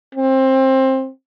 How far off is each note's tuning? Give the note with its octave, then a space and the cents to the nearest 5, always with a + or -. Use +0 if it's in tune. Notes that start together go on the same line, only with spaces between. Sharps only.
C4 +20